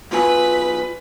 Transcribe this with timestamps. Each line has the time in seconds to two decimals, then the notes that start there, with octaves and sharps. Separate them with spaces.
0.11 B1 F4 B4 G#5